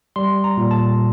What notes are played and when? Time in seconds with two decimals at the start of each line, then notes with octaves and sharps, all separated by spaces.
0.16 G3 C6
0.44 A#5
0.57 A#2
0.71 A5